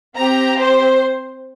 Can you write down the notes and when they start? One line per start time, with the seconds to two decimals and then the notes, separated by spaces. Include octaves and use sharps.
0.16 C4 G4 A#5
0.59 C5